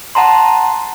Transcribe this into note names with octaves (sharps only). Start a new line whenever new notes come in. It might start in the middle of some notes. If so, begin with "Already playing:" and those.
F#5 A5 A#5 C6